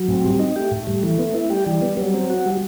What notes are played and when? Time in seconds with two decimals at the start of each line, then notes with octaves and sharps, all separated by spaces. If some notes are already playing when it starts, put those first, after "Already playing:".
Already playing: F#3
0.08 A2 C4
0.24 G3
0.39 D#4
0.56 A3 G4
0.71 A2
0.87 G3
1.03 E3
1.19 B3
1.35 E4
1.50 G3 G4
1.66 E3
1.82 B3
1.97 F#3 G3
2.14 C4
2.30 F#4
2.46 G3